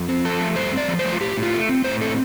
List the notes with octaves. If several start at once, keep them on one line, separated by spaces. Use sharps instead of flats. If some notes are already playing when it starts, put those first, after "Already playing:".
Already playing: F2
C4
F3 A4
A3
G2 C5
C4 D5
F3
C5
A3
F4
A2 G4
A2
F4
A3
C4
A2 C5
C4 A4